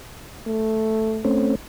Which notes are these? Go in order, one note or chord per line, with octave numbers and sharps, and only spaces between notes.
A3
A3 C4 C#4